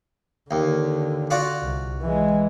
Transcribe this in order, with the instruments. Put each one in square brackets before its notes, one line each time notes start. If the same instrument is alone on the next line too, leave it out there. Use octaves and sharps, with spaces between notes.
[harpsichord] D#2 [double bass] D3
[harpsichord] F4 F#4 D5
[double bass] C2
E3 G#3